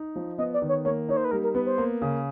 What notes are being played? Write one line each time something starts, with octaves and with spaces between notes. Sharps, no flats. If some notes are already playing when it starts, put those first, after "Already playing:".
Already playing: D#4
F3
B3 D#5
D5
D#3
C#5
A#3 C#5
D#4 C#5
C5
B4
G3 A#4
A#4
B3 B4
C5
A#3
C#3